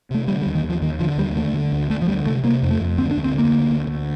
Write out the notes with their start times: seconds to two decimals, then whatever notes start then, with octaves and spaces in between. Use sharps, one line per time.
0.11 C3 A3
0.28 D3 G3
0.42 G3
0.46 D#2
0.55 D#3
0.64 D#2
0.70 F3
0.82 D#2 D#3
1.00 D3 F3
1.18 D#2 G3
1.36 D3 A3
1.54 D3
1.72 D2
1.90 D2 A3
2.02 F3
2.08 D2 G3
2.26 C3 A3
2.44 C3 A#3
2.63 F2
2.70 A3
2.81 F2
2.98 D2 C4
3.11 D4
3.17 D2
3.24 C4
3.34 D3 A#3
3.52 D2
3.70 D2
3.87 D2